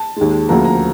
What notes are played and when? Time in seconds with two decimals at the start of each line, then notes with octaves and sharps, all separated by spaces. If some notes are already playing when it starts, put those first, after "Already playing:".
Already playing: A5
0.16 D#2 D#3 G#3
0.49 D2 C#3 F3 A#3 A#5
0.65 A#5